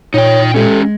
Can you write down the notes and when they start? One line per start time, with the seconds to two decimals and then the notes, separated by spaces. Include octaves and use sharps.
0.14 A#2 D#4 C#5 G5
0.54 G#3 C#4 G4 A4